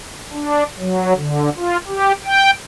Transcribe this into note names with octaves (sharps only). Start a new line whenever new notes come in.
D4
F#3
D3
F4
G4
G5